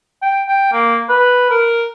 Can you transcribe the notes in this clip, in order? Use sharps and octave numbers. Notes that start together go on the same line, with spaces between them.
G5
G5
A#3
B4
A#4